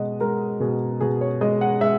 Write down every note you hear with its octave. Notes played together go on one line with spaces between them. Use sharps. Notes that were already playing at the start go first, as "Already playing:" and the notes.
Already playing: B2 G#3 D#5 F#5
G#3 A#4
B2 G#4
B2 G#4
C#5
G#3 D#5
F#5
G#3 E5